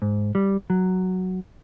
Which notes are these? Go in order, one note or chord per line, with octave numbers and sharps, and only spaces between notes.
G#2
G3
F#3